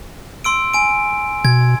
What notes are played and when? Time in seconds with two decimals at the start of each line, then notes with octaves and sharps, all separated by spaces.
0.44 C6 E6 D7
0.74 G#5 D7
1.45 B2 G#6